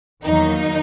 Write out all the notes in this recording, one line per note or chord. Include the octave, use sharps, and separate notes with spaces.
E2 D#3 F#3 A#3 D#4